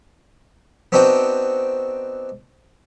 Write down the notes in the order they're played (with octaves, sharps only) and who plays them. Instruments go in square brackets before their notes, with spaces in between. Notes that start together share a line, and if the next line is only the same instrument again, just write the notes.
[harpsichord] B3 C4 D4 D#4 F#4 G5